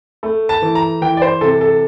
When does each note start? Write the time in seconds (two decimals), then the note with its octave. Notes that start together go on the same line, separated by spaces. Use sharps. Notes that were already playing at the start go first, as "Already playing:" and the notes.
0.23 A3
0.49 A5
0.62 E3
0.75 A#5
1.02 E3 G5
1.17 D5
1.22 C5
1.41 C3 A4
1.61 A4